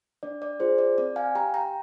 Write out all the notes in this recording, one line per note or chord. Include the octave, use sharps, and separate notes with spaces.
D4 D5
D5
F4 G#4 C5
D5
C4 D5
F5 G#5
G4 G5 A#5
G5 A#5